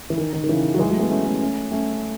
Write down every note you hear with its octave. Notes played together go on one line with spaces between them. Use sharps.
E3
D#3
D#3
D#3
C#3 E3
F#3
E3 G#3
F#3 A3
G#3 B3
A3 C#4
A3 C#4
A3 C#4
A3 C#4